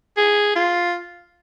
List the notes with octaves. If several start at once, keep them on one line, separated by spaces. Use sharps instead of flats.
G#4
F4